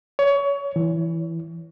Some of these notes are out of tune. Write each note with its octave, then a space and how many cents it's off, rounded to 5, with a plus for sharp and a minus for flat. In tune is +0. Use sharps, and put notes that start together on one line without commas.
C#5 +25
E3 +5